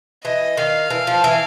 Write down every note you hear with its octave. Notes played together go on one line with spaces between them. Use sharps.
E3 D#5
D#3 F5
E3
F3
E3